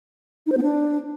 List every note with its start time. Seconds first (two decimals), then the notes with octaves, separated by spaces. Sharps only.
0.46 D#4
0.52 C5
0.57 B3
0.63 D4